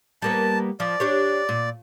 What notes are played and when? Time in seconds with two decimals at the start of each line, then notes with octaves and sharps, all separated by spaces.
0.22 G3 A#3 B3 A5
0.80 F3 D5
1.00 D4 G4 C#5
1.49 A#2